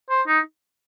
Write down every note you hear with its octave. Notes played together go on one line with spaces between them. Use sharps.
C5
D#4